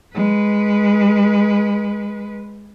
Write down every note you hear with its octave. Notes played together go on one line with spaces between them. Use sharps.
G#3 B4